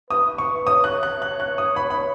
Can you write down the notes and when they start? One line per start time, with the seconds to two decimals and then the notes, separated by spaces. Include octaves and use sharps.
0.10 B4 D#6
0.38 C#6
0.66 C#5 D#6
0.84 F#6
1.03 F#6
1.22 F#6
1.40 F#6
1.58 D#6
1.76 C#5 B5
1.90 B5